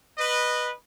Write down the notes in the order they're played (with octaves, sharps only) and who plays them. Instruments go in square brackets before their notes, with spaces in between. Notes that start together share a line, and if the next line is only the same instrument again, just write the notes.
[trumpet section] B4 D#5